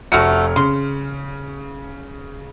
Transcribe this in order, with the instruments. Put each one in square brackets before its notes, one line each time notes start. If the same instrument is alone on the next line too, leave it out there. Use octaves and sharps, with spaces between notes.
[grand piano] F1 F6 C#7 [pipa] D3 A3 F#4
[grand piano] C#3 [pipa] C6